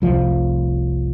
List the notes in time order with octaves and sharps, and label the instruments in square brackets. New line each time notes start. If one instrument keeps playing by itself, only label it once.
[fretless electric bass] F1 C2 F3